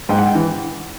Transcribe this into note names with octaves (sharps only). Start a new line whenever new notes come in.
G#2 G5
F#5
G5
E3